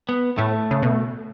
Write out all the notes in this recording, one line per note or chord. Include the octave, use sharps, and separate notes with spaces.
B3
A2 A3
C#3
B2